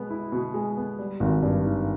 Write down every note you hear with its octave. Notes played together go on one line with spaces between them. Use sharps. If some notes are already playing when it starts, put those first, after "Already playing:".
Already playing: B2 G#3 B3
E4
B2
G#3
B3
G3
G#1
G2
D#3